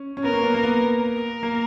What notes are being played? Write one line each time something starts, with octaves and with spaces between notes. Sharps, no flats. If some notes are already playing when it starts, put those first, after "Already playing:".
Already playing: C#4
C#4
B3 A#4
A#3
B3
A#3
B3
A#4
A#3